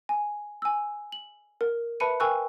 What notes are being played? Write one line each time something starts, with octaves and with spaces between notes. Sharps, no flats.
G#5
G#5 E6
F#7
A#4
B4 E5 A5 B5 C#7 D#7
A#4 G5 G#5 C#6 E6 F#6